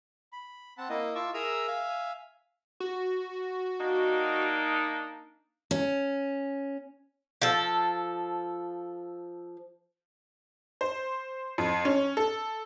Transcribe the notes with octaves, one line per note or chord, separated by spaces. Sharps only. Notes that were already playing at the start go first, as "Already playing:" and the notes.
B5
C4 F#5 A5
A#3 E4 D#5
E4 F4 A5 C#6 D6 E6
G#4 A#4 E5 A#5 D#6 E6
E5 F5 G#5
F#4
A#3 D4 D#4
C#4
F3 A4
C5
F2
C#4
A4